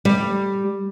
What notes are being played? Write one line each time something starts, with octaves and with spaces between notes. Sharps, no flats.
G3